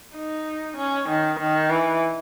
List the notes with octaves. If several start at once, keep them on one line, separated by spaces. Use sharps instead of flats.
D#4
C#4
D#3
D#3
E3